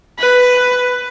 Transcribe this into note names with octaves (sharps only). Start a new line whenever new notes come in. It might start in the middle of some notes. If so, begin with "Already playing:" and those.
B4